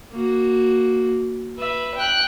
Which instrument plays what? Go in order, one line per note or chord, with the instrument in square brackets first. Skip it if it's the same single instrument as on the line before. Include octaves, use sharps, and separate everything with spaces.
[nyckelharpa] A#3 F#4
[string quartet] B4 [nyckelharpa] E5
[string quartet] G5 F#6